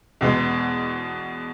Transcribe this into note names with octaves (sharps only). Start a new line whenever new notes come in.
E2 B2 G#3 B3